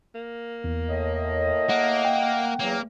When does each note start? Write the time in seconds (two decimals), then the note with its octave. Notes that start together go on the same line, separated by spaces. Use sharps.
0.15 A#3
0.64 E2
0.88 A2 D#5
1.69 A#3 F#5
2.05 G5
2.60 E2 C#3 F#3 A#3